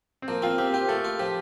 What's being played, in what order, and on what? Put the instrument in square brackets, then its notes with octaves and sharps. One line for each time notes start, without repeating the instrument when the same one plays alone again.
[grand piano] C4
[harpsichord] F3 [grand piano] A#3
[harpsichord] C4 [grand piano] F4
[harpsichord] C4 [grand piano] G4
[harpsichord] F4 [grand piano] G4
[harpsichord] A3 [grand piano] A4
[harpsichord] F4
[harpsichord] F3 [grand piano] G4